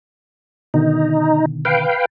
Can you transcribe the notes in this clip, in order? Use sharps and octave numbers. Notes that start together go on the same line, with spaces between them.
B2 D3 D#3 D#4
B4 F5 G5